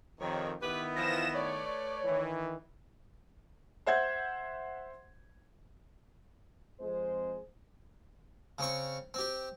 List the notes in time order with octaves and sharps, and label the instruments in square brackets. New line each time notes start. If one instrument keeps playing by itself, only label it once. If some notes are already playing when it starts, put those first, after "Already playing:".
[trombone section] F2 D#3 [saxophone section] C3 C#5
[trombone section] D#3 B3 E4 [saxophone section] G4 B4
[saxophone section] E3 F3 [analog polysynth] A#6 E7
[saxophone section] A3 B4 D5 [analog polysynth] C#5
[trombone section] D#3 E3
[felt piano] C5 E5 F#5 G6 G#6
[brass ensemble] F2 G#3 C5
[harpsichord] C#3 C4 C#6
C4 G4